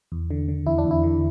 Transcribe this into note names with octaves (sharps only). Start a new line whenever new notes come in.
E2
D3
D3
E2 E4
D4
E2
E4
D3